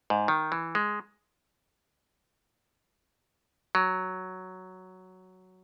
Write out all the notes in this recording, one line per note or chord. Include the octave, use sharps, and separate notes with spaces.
G#2
D#3
E3
G#3
F#3